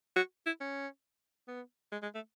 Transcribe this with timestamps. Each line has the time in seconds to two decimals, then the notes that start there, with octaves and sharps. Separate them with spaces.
0.16 F#4
0.46 E4
0.61 C#4
1.48 B3
1.92 G#3
2.02 G#3
2.15 A3